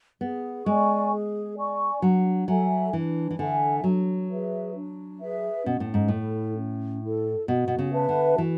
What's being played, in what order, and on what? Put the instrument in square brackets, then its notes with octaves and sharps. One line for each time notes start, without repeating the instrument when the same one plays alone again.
[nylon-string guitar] B3 [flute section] G#4
[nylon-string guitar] G#3 [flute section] D5 G#5 C#6
[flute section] G#4
D5 G#5 C#6
[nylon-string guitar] F#3 [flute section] D4
[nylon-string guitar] F#3 [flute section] A4 E5 G#5
[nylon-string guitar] E3 [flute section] D4
[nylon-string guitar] E3
[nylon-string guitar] D3 [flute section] A4 E5 G#5
[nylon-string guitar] F#3 [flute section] D4
[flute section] G#4 B4 E5
D4
G#4 B4 E5
[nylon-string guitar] B2 [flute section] C#4
[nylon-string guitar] A2
G#2
[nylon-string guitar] A2 [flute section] E4 A4
[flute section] C#4
E4 A4
[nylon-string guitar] B2 [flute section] F#4
[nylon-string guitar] B2
C#3
[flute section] B4 E5 A5
[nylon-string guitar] D3
[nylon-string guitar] E3 [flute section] F#4